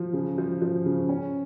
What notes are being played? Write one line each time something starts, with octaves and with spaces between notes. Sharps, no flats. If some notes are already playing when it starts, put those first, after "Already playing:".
Already playing: F3
C#3
F3
F3
C#3
C#4